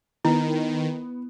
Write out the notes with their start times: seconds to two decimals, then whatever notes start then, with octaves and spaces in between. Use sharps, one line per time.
0.25 D#3 B3 E4